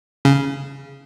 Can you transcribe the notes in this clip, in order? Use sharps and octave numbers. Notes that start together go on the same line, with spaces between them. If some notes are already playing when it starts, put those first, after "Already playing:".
C#3